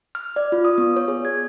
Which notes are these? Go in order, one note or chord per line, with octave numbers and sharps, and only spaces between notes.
F6
D5
F4
D#6
B3
C#5
G#4
G#6